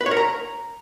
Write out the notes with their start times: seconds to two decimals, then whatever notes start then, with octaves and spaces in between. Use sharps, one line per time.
0.01 B4
0.06 C#5
0.11 A#4
0.17 A#5